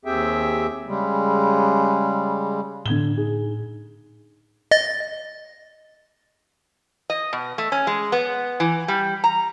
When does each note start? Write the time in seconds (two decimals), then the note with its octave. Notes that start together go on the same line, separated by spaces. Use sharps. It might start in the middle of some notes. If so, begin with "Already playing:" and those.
0.05 D#2 C4 G4 G#4 E5 G5
0.87 C#3 G3 G#3
2.86 A2 D3 G#6 G7
3.17 D#4 G#4
4.71 D#5 A6
7.10 D#5
7.33 B2
7.58 A3
7.72 C#4
7.87 G#3
8.12 B3
8.60 E3
8.88 G3
9.24 A#5